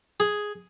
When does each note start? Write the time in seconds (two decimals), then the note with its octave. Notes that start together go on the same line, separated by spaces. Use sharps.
0.20 G#4